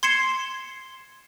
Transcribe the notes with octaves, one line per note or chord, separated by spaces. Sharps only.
C6 G#6 C7 C#7 E7